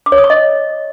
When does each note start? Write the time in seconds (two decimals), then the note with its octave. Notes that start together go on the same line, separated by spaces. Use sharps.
0.06 D6
0.12 C#5
0.18 D#6
0.24 C#6
0.30 D#5